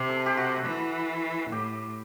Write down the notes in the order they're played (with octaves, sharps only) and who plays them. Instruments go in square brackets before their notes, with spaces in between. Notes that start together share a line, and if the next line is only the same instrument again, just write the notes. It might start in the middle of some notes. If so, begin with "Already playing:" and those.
Already playing: [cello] C3 [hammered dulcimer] G4
[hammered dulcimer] A4
G4
F#4
[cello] E3
[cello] A2 [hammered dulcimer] G4